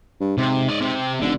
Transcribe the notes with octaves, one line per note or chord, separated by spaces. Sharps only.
G2
G#2 C3
D5 D#5
C3 C4
F1 D3